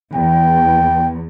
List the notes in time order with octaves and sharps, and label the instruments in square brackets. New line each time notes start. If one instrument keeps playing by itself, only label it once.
[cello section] E2 [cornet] G5